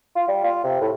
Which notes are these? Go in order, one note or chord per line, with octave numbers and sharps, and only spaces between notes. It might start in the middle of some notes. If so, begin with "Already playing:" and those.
F4
G3
F4
C3
A2